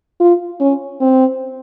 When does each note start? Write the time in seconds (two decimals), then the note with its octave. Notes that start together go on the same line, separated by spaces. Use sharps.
0.20 F4
0.61 C#4
1.01 C4